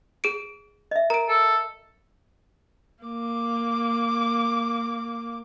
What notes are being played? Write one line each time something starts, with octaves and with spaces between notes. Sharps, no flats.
G#4 D7
D#5 E5
A#4 A#5 D7
A4
A#3 D6